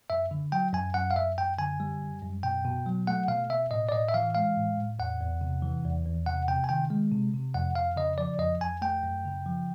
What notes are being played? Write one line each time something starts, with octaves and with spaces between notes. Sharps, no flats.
F#2 E5
D3
F#3 G5
F#2 G#5
F#2 F#5
F5
F#2 E5
F#2 G5
D3 G#5
G3
F#2
F#2
B2 G5
B2
F#3
A3 F#5
B2 F5
B2 E5
A2 D#5
D5
A2 D#5
E5
E3 F5
G#3 F5
A2
A2
E2 F#5
E2
C3
E3
E2
E2
C3 F#5
C3 G5
G#5
D#3 G5
G#3
C3
C3
F2 F#5
F2 F5
C#3 D#5
F3 D5
F2 D#5
F2 G#5
A3 G5
F#2
C#3
F3